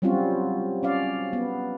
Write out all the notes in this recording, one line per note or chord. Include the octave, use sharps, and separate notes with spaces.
F#3 G3 C4 C#4 F4 F#4
C#4 D5 F5
B3